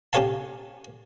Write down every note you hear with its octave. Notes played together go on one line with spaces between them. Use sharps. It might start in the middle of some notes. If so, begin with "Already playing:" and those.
C#4 G4 A4 C#5 F5 A5